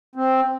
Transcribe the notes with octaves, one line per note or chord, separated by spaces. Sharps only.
C4